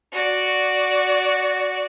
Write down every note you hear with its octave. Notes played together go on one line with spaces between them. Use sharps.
F#4 D5